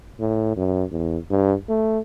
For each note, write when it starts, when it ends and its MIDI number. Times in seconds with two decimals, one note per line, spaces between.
0.20 0.56 45
0.57 0.84 42
0.91 1.18 40
1.30 1.54 43
1.69 1.99 57